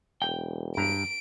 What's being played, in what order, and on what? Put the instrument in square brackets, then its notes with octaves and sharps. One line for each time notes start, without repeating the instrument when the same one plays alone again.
[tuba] E1 [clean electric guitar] G5
[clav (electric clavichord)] G2 A#5 [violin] D7